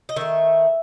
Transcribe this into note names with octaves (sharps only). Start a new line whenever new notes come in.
D#5
D#3 A3 E5